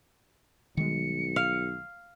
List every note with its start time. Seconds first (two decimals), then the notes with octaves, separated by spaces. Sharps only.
0.77 B1 D#3 G3 G#3 C#7
1.36 F5